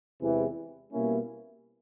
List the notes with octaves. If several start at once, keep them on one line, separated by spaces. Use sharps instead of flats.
E2 C3 E3 G#3 B3
B2 G3 A#3 C#4 E4